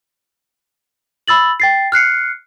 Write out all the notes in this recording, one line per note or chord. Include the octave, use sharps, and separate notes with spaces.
B5 E6 A6 F#7
G5 A6 C7
F6 F#6 C7 C#7